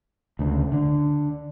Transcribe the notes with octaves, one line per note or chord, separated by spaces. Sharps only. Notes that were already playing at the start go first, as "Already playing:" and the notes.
D2 C#3
D3